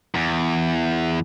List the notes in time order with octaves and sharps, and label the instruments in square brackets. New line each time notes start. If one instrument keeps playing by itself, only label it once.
[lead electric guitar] E2